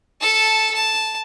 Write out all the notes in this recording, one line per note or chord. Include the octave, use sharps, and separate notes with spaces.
A4 A5
A5